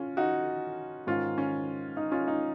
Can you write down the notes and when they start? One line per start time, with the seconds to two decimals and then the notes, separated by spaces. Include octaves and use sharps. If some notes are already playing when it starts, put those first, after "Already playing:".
Already playing: C#4 F4
0.17 D#4 F#4
1.07 G#2 D#3 C#4 F4
1.38 C#4
1.97 D#4
2.11 C#4 F4
2.28 D#4